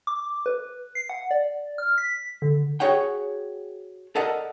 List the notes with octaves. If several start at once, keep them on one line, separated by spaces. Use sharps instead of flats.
D6
B4
C7
F#5
D5
F6
B6
D3
F#4 G#4 C#5 F#5 G5
A4 A#4 D5 D#5 F#5